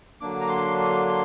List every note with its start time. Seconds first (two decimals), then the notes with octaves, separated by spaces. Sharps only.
0.21 D3 F#3 A#3 D4 D6
0.41 A#5
0.49 C6
0.78 C6
1.07 C6